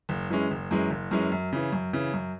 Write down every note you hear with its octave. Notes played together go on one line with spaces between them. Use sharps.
F#1
F#2 E3 G#3 C#4
F#1
F#2 E3 G#3 C#4
F#1
F#2 E3 G#3 C#4
F#2
C#3 E3
F#2
C#3 E3
F#2